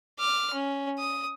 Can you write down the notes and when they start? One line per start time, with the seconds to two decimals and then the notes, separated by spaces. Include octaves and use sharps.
0.19 D6 F6
0.53 C#4
0.99 D#6